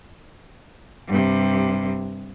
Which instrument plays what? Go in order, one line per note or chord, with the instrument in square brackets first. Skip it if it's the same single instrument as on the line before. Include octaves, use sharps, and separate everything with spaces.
[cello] G2 C3